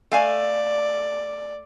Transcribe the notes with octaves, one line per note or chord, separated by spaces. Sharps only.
A3 D5 F5 G#5